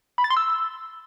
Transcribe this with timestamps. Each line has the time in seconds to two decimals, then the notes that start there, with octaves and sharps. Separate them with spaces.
0.18 B5
0.24 A6
0.30 C6
0.37 E6